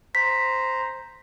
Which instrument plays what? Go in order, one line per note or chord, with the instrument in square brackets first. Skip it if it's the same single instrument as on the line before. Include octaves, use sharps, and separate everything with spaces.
[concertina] C5 A#5 [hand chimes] B6